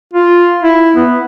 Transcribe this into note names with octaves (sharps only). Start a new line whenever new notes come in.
F4
E4
B3